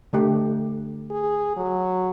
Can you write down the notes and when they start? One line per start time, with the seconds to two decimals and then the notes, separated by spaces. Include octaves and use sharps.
0.13 D3 A3 G4
1.11 G#4
1.57 F#3